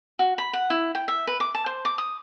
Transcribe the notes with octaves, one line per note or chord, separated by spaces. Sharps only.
F#4
B5
F#5
E4
G5
E5
B4
D6
A5
C5
D6
D#6